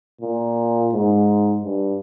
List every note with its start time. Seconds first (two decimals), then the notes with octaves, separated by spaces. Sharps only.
0.21 A#2
0.93 G#2
1.64 G2